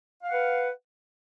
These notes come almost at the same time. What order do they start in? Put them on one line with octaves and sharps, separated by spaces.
F5 F#5 B4